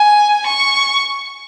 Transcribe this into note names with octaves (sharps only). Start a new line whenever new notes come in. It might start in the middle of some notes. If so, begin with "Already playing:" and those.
Already playing: G#5
C#6